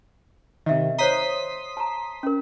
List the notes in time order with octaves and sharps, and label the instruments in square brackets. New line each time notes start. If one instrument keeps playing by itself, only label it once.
[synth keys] C3 D#3 [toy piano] D#5 E5
[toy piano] C5 C#5 A#5 [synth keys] C6 D#6 B6
[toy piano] A5 A#5
C#4 A#4